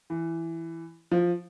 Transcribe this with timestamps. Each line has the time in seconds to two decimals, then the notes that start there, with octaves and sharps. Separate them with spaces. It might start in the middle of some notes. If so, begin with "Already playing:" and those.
0.10 E3
1.11 F3